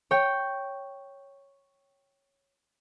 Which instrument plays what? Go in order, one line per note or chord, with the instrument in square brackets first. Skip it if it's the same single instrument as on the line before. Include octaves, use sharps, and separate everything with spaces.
[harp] C#5 G5